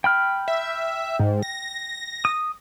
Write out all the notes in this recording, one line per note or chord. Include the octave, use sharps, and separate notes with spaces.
G5 B5 F6
E5
G#2
A#6
D#6